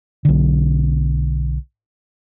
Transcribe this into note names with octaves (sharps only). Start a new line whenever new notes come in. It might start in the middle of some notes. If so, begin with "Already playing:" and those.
B1 D3